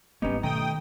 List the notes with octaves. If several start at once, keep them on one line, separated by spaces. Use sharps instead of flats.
G#1 G#2 G3 A#3 B3 C#4 D#4
B2 D#3 A3 C#4 G5 A#5 D#6